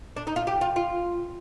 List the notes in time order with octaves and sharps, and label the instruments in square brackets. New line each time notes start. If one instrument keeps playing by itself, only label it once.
[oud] D4
D#4
F4
G4
F4
F4